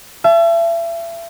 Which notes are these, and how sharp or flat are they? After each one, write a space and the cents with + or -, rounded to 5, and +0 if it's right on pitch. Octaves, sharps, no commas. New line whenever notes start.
E5 +35 A5 -30